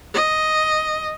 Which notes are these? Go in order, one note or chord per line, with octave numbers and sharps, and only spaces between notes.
D#5